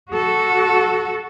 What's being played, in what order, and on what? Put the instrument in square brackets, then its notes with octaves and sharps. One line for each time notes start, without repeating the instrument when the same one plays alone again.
[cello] F#4 A4